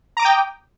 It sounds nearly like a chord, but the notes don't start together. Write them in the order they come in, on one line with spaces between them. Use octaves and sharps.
A#5 D6 D#6 G5